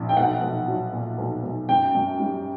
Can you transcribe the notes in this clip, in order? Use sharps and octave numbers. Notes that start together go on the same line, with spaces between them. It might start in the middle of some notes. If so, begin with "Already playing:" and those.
Already playing: A#1
G5
B1 F#5
B1
F#3
A#2
B1
B1
F#2 G5
F#2
G3